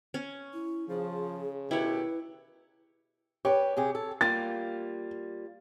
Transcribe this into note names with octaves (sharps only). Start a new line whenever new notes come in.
C#4
E4
C#3 F3 G#4
B2 D#3 E4 G4 B4 C#5
G4 B4 C#5
C3 G4 G#4
A4
G3 A#3 F4 A6